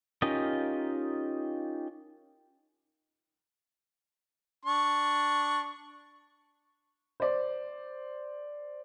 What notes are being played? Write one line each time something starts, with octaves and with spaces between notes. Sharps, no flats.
C#4 D#4 F4 G4 A#4 D#5
D4 C#6
C5 D5